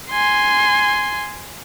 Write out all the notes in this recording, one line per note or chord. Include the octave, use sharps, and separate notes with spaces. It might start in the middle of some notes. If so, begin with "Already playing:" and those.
G#5 C6